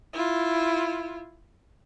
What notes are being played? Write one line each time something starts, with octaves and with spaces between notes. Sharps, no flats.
E4 F4